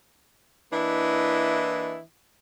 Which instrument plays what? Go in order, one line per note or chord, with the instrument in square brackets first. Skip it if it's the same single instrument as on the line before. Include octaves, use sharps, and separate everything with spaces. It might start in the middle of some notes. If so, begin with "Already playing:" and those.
[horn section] E3 A#3 D4 E4 D#5